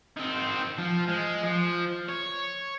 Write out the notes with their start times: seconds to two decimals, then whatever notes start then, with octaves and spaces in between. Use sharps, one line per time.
0.17 D#3 C4
0.78 F3
1.08 G#3
1.43 F3
2.09 C#5